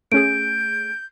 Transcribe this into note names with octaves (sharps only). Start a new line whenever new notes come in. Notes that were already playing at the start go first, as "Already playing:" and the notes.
A3 C#4 G#4 G6 D7